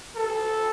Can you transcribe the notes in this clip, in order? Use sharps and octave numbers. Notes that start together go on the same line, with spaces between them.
A4